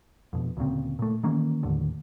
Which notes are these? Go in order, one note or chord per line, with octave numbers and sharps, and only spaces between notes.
F2 B2
D2 A#2 C#3 C4
A#2 A3
D#3 E3 A#3 C#4
D#2 A2 D3